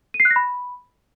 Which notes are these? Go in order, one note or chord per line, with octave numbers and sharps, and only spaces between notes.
D#7
C7
F#6
A#6
B5